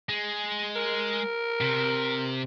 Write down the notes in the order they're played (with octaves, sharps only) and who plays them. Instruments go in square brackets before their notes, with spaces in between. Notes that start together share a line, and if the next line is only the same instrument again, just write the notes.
[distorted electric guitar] G#3
[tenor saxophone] A#4
[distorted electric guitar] C3